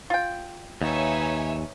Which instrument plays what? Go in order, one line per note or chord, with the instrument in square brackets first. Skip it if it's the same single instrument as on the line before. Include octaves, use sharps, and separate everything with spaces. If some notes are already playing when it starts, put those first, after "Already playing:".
[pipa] F4 G5
[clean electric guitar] D#2 [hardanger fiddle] D#4 B4 [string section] C#5 E5 G#5